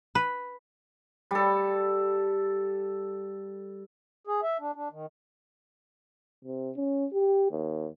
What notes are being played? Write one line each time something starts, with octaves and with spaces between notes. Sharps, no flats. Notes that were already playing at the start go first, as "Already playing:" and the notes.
B4
G3 A4
G#4
E5
D4
D4
D#3
C3
C#4
G4
D#2